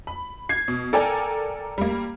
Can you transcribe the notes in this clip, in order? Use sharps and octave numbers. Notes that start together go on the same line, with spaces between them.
B5
G#6 C7
B2
A4 A#4 D5 G5 G#5 A#5
G3 A#3